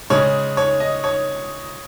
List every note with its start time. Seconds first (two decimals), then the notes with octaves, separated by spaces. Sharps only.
0.10 C#3 G#3 C#5
0.57 C#5
0.80 D#5
1.04 C#5